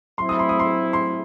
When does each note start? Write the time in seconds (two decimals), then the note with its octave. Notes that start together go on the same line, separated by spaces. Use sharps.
0.18 F#3 C4 E4 C6
0.29 D#6
0.39 C6
0.49 D#6
0.59 C6
0.93 C6